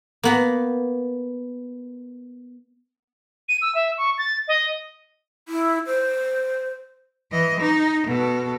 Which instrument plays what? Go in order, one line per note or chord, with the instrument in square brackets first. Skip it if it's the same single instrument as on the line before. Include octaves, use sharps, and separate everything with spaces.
[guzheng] A#3 B3 A#5
[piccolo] D#7
E6
E5
C#6
A6
D#5
[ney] E4
C5
[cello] E3 D#5
D#4
B2 A4